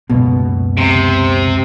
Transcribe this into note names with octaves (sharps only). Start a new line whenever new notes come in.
C#2 F#2 B2 A#3
C3